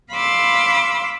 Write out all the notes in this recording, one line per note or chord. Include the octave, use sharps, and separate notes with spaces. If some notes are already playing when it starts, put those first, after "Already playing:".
F5 B5 C6 D6 E6